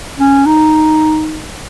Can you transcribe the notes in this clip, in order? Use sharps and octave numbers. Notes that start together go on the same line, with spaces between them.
C#4
D#4